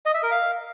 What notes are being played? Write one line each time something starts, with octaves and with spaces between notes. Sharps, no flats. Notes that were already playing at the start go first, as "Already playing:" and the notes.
D#5
E5
A#4
F5